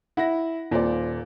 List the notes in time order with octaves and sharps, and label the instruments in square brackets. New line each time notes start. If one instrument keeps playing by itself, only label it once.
[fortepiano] E4 [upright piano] F#5 A#6
[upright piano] D#1 C5 D5 [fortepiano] A#2